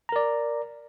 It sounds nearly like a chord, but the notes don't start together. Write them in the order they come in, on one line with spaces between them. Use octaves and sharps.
A#5 A#4 D5